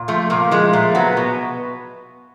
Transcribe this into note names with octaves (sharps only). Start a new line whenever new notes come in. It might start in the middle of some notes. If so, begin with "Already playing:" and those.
Already playing: A#2
F3 A3
A#2 A#3
F3 G#3
A#2 A3
F#3 B3
B2